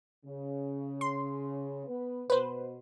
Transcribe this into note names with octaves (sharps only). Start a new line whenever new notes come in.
C#3
C6
B3 B4
B2 B4 C5